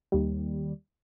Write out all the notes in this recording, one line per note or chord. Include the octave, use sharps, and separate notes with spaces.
D#2 G3